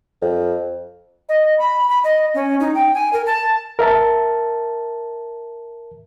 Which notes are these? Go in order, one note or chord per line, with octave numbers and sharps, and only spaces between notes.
F2
D#5
B5
B5
D#5
C#4
D#4
G5
G#5
A#4
A5
A#4 E5 A5